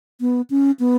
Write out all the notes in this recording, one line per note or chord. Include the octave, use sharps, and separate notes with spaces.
B3
C#4
B3